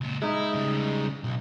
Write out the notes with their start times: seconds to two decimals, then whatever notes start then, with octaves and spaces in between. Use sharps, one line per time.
0.01 C#2 A#2
0.22 G#3 D#4 E4
0.53 C#3 G3
1.24 B1